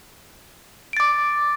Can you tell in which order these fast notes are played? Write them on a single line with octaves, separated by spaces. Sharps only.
D7 A6 D6